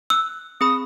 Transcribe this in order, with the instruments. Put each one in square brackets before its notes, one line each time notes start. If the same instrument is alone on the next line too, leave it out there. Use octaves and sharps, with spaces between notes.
[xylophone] E6 [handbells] F#6
[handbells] C4 G#4 B5 [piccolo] D#6